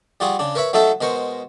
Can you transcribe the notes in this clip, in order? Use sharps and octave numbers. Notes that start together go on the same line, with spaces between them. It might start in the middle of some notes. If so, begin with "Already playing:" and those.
G3 F4 F#4 G#4 D#6
C#3 D4
A#4 B4 C#5 E5 B5
F#3 A3 D#4 F#4 A4 E5
B2 G#3 A#4 C5 C#6